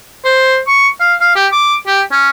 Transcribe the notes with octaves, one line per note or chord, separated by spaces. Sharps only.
C5
C#6
F5
F5
G4
D6
G4
C#4